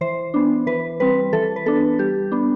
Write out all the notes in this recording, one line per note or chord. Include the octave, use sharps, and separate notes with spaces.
E3 C5
B3 D4
E3 B4
G3 C4 B4
E3 A4
B4
B3 D4 A4
G3 G4
B3 D4